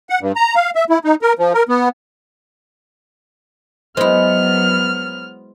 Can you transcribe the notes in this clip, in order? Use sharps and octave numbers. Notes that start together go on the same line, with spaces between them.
F#5
G2
A#5
F5
E5
E4
D#4
A#4
F3
A#4
B3
F#3 G#3 B3 E4 C5 F6